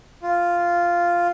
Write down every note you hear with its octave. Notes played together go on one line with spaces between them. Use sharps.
F4